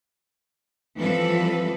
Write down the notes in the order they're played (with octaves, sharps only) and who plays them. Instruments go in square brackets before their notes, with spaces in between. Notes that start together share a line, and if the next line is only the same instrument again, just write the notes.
[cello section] E3 F3 G3 C4 A4 B4